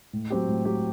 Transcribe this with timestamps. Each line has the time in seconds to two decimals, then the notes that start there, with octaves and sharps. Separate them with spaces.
0.13 A2
0.30 F#3 C4 G4
0.48 A2
0.65 F#3 C4 G4